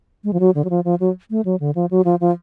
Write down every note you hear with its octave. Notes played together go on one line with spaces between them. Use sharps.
G#3
F3
F#3
D3
F#3
F3
F3
F#3
A3
F#3
D3
F3
F#3
F3
F3